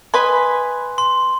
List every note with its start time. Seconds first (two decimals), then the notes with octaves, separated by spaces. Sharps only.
0.14 B4 D#5 G#5 B5 C6
0.98 C6